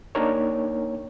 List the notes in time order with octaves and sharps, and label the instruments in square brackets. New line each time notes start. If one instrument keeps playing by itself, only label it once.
[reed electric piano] A#3 D4 D#4 A#4 C#5